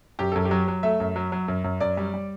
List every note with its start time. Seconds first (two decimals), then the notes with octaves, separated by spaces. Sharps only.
0.19 F#2 G4
0.32 F#2 A4
0.45 G4
0.51 F#3
0.68 F#3
0.83 A3 E5
1.00 F#2
1.16 F#3
1.32 F#3
1.48 F#2
1.64 F#2
1.80 F#2 D5
1.97 G3
2.14 G3